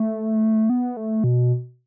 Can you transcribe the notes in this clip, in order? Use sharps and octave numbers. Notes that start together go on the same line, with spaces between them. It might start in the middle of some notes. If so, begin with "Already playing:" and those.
Already playing: A3
B3
A3
B2